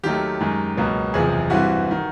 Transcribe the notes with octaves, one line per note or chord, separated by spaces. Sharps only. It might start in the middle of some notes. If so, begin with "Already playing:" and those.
D#2 D#3 F#3 A3 G4
F#2 D#3 G#3
C#2 B2 F#3 A#3
F#1 E2 C3 F3 G#4
G2 E3 G3 C4 F#4
D#3